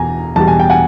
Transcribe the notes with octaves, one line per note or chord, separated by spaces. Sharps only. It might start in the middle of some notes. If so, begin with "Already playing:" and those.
Already playing: E2 B2 G#5 A#5
E2 B2 G3 A5
G#5
G5
F#5 G#5